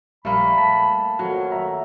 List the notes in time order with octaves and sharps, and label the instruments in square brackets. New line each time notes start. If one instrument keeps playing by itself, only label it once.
[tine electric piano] A#1 G3 [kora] A3 A#3 [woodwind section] B5
[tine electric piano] A5 B6
[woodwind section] F2 D#3 [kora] F#3
[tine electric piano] E5 A#5